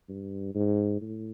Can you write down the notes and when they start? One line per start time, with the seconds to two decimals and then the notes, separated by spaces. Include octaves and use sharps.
0.09 G2
0.55 G#2
1.02 A2